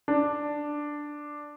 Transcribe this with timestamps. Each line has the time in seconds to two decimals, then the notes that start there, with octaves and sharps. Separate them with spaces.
0.08 D4